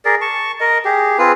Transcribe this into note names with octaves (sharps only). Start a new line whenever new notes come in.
G#4 A#4 D5
A5 C#6
A#4 D#5
G4 G#4
C4 F4 G#4 B4